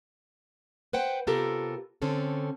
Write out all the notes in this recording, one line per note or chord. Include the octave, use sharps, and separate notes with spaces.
B4 C5 F#5 G5
C3 B3 F4 G4 A4 A#4
D3 C4 C#4 A4